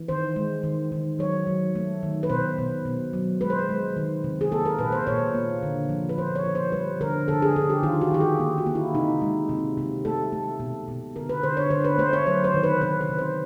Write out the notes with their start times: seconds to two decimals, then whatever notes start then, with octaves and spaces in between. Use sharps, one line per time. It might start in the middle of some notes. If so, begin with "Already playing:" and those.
Already playing: E3
0.08 D#3 C5
0.36 G#3
0.63 D#3
0.92 D#3
1.19 F#3 C#5
1.47 F#3
1.75 A3
2.03 D#3
2.23 B4
2.30 B2 C5
2.58 B2
2.85 B2
3.13 F#3
3.41 G#3 B4
3.50 C5
3.59 B4
3.69 G#3
3.97 D#3
4.24 C3
4.41 G#4
4.52 A#3 A4
4.66 A#4
4.79 A#2 B4
4.92 C5
5.07 A#2 C#5
5.35 A#3
5.63 D3
5.89 F3
6.09 B4
6.18 F3 C5
6.36 C#5
6.45 F3
6.55 C5
6.72 G3 B4
7.01 D3 A#4
7.28 D3 A4
7.42 G#4
7.56 D3 A4
7.70 G4
7.83 D#3 F4
8.01 F#4
8.11 D#3 G4
8.20 G#4
8.40 A#3
8.58 F#4
8.66 A#3
8.75 E4
8.94 C3 D#4
9.22 G#3
9.49 C3
9.77 C3
10.05 A3 A4
10.32 A3
10.60 B2
10.88 B2
11.16 D3 A#4
11.29 B4
11.43 D3 C5
11.57 C#5
11.70 D3 C5
11.84 B4
11.98 A3 C5
12.13 C#5
12.26 F#3 C5
12.44 C5
12.54 D#3
12.63 B4
12.81 C3 B4
13.01 B4
13.09 C3
13.19 C5